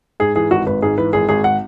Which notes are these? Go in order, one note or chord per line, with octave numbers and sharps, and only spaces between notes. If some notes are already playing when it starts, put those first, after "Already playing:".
G#2 G#4
E3 G#4
G#1 F#4
G#1 B4
G#2 G#4
E3 B4
G#1 G#4
G#1 G#4
F#5